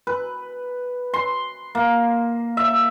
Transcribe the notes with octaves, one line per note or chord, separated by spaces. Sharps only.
B4
C6
A#3
E5